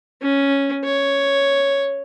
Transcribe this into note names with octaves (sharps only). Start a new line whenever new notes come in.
C#4
C#5